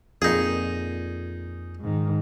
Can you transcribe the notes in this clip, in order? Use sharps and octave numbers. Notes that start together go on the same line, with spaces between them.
F2 A#2 D#4 G#4
G#2 D#3